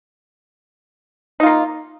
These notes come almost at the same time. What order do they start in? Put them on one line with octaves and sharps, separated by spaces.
D#4 F4 A#3